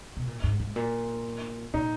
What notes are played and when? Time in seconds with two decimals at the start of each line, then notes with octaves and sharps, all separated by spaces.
0.17 B2
0.27 A#2
0.44 G#2
0.60 G#2
0.76 A#2
1.74 A#2 D#4